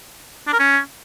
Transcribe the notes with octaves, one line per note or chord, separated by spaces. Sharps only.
D4
A#4
C#4